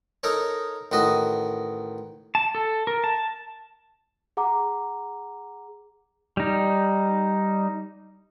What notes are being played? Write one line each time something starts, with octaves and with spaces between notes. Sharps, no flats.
D#4 A4 A#4 C#5
A1 D#3 F#4 D#5
A5
A4
A#4
A5
G#4 F#5 A#5 D6
G3 D#4